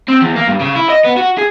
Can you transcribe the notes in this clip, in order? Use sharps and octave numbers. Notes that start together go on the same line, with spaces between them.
C4
E2
A#3
G2
C#3
E4
D#5
B3
F#4
G#4